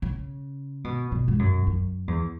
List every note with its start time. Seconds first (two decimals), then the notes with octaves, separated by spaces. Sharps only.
0.02 C#3
0.84 B2
1.12 B2
1.28 G#2
1.39 F#2
1.67 F#2
2.08 E2